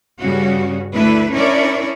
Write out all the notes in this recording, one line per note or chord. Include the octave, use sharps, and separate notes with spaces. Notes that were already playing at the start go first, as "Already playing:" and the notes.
G2 C#3 G3 C#4 F#4
D2 A3 D4 E4 B4
C#4 D4 E4 A#4 C#5 D5